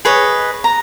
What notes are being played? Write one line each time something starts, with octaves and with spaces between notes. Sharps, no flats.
G#4 B4 C#5 D#5
A#5